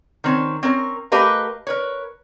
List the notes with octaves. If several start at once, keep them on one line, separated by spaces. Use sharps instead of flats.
D#3 C4 C#4
C4 C#4 A#4
A3 G4 A#4 B4 D#5 F5
A#4 B4 C#5